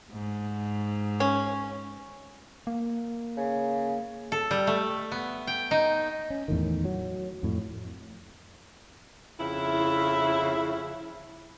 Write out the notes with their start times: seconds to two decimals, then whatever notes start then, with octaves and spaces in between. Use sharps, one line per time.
0.12 G#2
1.20 C#4
2.67 A#3
3.37 C#3
4.32 A4
4.51 G3
4.67 A3
5.12 B3
5.47 G5
5.71 D#4
6.30 C#4
6.48 E2 A2 D#3
6.85 F#3
7.43 F2 A2
9.38 F2 C#3 E4